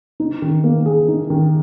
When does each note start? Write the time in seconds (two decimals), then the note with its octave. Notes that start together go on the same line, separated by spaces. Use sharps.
0.20 D#4
0.42 D#3
0.64 A#3
0.86 G#4
1.08 D#4
1.30 D#3